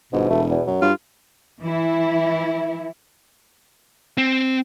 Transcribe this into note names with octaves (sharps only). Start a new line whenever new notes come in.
G1 G#2 B2
E1 A3
E2
F#2 F#3
G2 F4
E3 E4
C4